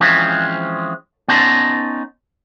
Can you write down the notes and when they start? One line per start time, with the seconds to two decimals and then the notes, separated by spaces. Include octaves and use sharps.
0.01 E3 F3 G#3 C4 C#4
1.28 B3 C#4 D#4 A5 C6